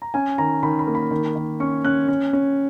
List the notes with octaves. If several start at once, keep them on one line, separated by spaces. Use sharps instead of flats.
A#5
C#4 G#5
D#3 A#5
D#3 B5
B5
A#3
B5
D#3
D#3
C#4 C#6
C#4 F#6
C#4
C#4